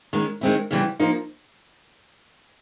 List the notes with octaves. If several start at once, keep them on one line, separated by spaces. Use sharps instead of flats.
D#3 G#3 C#4
D#3 G#3 C4 E4
F#2 C#3 E3 G3 C4
F3 A#3 D#4